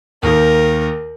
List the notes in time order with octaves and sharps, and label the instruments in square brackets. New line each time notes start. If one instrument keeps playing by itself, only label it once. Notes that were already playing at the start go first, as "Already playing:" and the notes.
[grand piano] D#2 D#3 [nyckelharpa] A#4